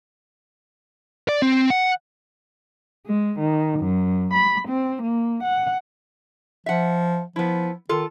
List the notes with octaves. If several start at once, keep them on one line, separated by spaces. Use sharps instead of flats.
D5
C4
F#5
G#3
D#3
F#2
B5
C4
A#3
F#5
F3 E5 F#5
F3 B3 E4
D#3 F4 A4